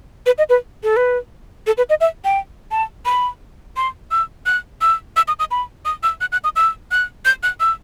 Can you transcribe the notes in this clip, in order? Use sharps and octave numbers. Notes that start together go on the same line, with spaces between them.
B4
D#5
B4
A4
B4
A4
B4
D#5
E5
G5
A5
B5
C6
E6
F#6
E6
E6
D#6
D#6
B5
D#6
E6
F#6
F#6
D#6
E6
F#6
G6
F#6
E6